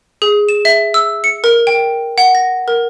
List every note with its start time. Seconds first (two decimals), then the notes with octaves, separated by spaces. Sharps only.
0.22 G#4
0.49 E7
0.65 E5
0.94 E6
1.24 C#7
1.44 A#4
1.67 G5
2.18 F#5
2.35 A#6
2.68 A#4